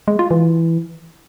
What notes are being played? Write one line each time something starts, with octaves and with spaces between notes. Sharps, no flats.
G#3
F4
E3